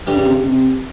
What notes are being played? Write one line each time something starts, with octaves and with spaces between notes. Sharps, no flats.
G2 D3 G3
C#3
C3
C#3
C3